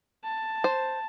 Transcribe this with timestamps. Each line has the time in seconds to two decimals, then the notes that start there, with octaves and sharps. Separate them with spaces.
0.24 A5
0.64 C5